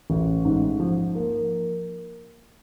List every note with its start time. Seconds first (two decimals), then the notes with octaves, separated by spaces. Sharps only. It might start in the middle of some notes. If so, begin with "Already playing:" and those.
0.10 A1
0.45 G#2
0.80 F3
1.15 A#3